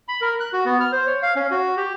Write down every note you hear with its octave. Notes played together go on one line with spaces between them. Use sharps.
B5
A#4
F#6
F#4
B3
F6
C5
C#5
F5
C#4
F#4
G4